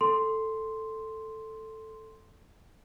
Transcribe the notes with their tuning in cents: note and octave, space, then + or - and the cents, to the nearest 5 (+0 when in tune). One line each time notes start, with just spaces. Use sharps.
A4 +0 C6 +0